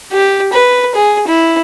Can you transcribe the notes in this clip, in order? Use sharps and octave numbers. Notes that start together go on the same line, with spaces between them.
G4
B4
G#4
E4